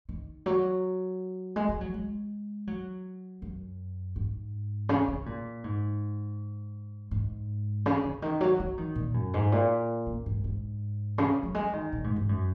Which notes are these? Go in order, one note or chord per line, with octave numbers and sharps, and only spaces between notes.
D#3
F#3
G#3
G#3
F#3
G#3
F#3
F#2
G#2
C#3
C#3
A#2
G#2
G#2
C#3
C#3
D#3
F#3
F#3
D#3
A#2
F#2
G#2
A#2
C#3
G#2
G#2
C#3
F#3
G#3
D#3
A#2
G#2
G#2
F#2